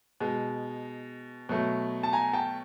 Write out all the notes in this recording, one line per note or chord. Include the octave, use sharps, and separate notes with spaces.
B2 G#3
B2 F#3 A3
A5
G#5 A#5
G5 A5